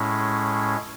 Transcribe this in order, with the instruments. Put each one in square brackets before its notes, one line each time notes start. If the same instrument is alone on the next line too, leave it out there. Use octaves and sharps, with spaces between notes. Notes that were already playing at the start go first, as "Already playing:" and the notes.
Already playing: [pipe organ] A2 G#3 C#4 E4